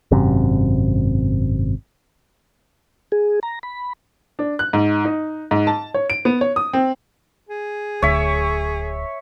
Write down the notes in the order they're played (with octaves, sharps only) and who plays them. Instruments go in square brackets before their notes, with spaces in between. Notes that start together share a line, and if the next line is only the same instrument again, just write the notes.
[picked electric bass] G#1 F#2 C3
[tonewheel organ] G#4
A#5
B5
[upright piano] D4
F#6
G#2
D#4
G#2
A5
C#5
D7
B3
C#5
D#6
C4
[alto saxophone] G#4
[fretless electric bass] D1 D2 [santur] C#5 E5